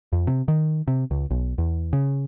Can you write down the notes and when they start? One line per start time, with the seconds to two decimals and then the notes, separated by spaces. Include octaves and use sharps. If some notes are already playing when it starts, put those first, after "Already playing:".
0.13 F2
0.27 C3
0.48 D#3
0.88 C3
1.11 C#2
1.31 B1
1.58 E2
1.93 C#3